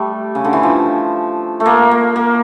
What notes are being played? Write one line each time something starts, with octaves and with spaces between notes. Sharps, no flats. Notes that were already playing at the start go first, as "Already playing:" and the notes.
Already playing: G3 A3
C#3
D3
E3
F3
A3
A#3
A#3
A#3